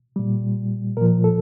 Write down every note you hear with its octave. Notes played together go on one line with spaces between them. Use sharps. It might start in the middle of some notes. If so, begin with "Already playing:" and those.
A#2 G3
A#2 F3 A#4
A4